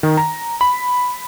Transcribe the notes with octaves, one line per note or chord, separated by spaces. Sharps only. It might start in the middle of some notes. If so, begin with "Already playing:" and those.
D#3
A#5
B5